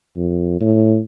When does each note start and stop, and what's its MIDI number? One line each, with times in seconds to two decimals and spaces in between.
0.17 0.57 41
0.60 0.99 45